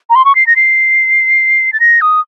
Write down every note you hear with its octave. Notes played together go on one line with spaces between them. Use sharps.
A#5
C6
C#6
C7
A#6
C7
A6
A#6
D#6